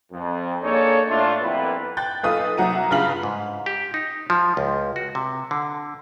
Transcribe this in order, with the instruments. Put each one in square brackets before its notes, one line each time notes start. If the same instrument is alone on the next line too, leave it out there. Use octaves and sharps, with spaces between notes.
[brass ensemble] F2
A#3 D4 D#4 G#4 A4 C#5
A2 A3 D4 F4
F2 A#2 G3 B3 E4 B4
[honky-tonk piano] G5 F#6 G6 A6
B1 F4 A4 B4 D#6
C2 F#3 F#5 A#5 D#7
G2 C#3 F4 F6 B6 F#7
[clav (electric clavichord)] G#2
G4
D#4
F3
C#2
F#4
C3
D3